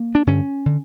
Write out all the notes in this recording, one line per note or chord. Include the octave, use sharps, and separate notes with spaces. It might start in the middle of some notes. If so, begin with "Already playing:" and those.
Already playing: A#3
D4
G2 D3 C#4
D3